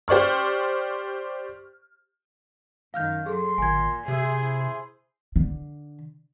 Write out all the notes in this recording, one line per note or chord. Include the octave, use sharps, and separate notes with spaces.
G4 C5 D5 C#6 F6
F#2 D#3 F5 F6 G6
F#3 G#4 A4 C6
G#1 A#2 G#5 G#6
C3 G#4 C5 E5
E4
D3